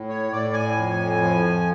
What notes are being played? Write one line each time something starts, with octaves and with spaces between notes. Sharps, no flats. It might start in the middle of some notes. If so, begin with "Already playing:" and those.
Already playing: A2
C#5
A2 D5
G#5
F2
F3